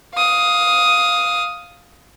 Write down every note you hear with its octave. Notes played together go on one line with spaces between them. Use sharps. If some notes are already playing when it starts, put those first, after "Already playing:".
F5 D#6